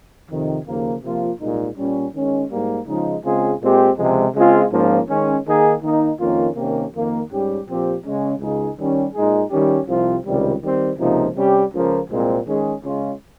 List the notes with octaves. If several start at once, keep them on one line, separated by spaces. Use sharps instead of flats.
F2 C3 D#3
D#2 C#3 F3 A#3
C3 F3 A#3 F4
C2 A#2 G#3 D#4
A#2 G3 C#4
D#3 G#3 C#4
G#2 G3 A#3
C#3 F3 G#3 D#4
C#3 G#3 C4 F4 G#4
A#2 G#3 C4 G4
C#2 C3 F3 G#3
C#3 G#3 C4 F4 G#4
G#2 F3 A#3 C#4 F4
D#3 G#3 C#4
D#3 A#3 D#4 G#4
D#3 A#3 D#4
F2 D#3 A#3 C#4 F4
C3 D#3 A#3 C#4 G4
F2 D#3 A#3
G#2 G3 C#4 G4
A#2 F3 C4 G4
C#3 G#3 C#4
C#2 C#3 G#3 D#4 G#4
D#3 G3 C#4 G4
A#2 G#3 D#4 G#4
D#3 G3 C#4 G4
C2 C3 F3 C4 F4
C#2 C3 D#3 G3
D#3 G3 C4
C#2 C3 F3 A#3 D#4
C3 G3 C#4 G4
C#2 C#3 F3 A#3
C2 A#2 G#3 C4
D#3 G#3 C#4 G#4
C#3 G#3 C#4 F4